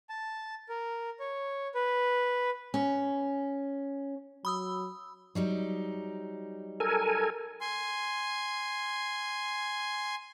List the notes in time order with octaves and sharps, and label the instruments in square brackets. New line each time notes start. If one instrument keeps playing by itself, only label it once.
[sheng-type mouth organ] A5
A#4
C#5
B4
[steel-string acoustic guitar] C#4
[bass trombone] F#3 [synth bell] B5 D#6 E6
[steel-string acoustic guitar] F#3 G3 D#4
[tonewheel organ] A4 A#4 G#5
[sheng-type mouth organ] G#5 C6